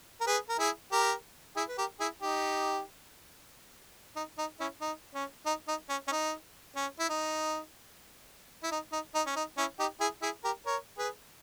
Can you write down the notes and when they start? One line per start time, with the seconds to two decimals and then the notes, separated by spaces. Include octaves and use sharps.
0.21 A#4
0.27 G#4 B4
0.49 A#4
0.59 E4 G#4
0.92 G4 A#4
1.56 E4 G#4
1.69 B4
1.78 G4 A#4
2.00 E4 G#4
2.22 D#4 G4
4.16 D#4
4.38 D#4
4.60 C#4 E4
4.81 D#4
5.14 C#4
5.46 D#4
5.68 D#4
5.89 C#4
6.08 C#4
6.12 D#4
6.76 C#4
7.00 E4
7.09 D#4
8.63 E4
8.72 D#4
8.92 D#4
9.15 D#4
9.27 C#4
9.36 D#4
9.58 C#4 E4
9.79 D#4 G4
10.00 E4 G#4
10.22 E4 G#4
10.44 G4 A#4
10.66 A#4 C#5
10.98 G#4 B4